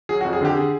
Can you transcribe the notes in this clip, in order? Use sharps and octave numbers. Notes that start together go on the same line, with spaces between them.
F#3 G#4
F#4
F2
G#4
D3 G4
G#4